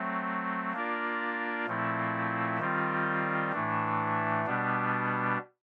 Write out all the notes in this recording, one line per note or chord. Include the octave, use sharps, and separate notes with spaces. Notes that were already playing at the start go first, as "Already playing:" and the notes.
Already playing: F#3 A3 C4
A#3 D4 F4 A#4 D5
A#2 F3 A3 C4 E4
D#3 G3 C4 F4
A2 E3 A3 D4
B2 G3 B3 D4